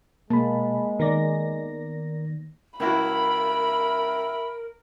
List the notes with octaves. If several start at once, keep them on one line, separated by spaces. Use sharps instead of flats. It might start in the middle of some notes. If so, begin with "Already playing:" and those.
B2 G#3 A#3 A5 B5
D#3 B3 A#4 D5 A#6
C#2 E4 F#4 A#4 E5 B5